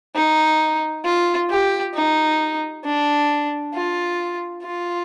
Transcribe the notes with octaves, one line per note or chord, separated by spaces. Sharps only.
D#4
F4
G4
D#4
D4
F4
F4